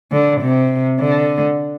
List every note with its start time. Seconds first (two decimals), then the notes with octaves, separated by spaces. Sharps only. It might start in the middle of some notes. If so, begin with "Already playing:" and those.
0.12 D3
0.41 C3
1.00 D3